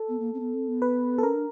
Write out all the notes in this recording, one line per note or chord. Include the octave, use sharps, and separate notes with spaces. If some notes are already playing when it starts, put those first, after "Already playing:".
Already playing: A4
B3
A#3
C4
B3
C4
B3
B4
A4
C#4 A#4
D4